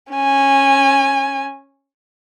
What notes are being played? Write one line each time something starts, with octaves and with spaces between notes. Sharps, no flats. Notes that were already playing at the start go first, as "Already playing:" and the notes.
C#4 G#5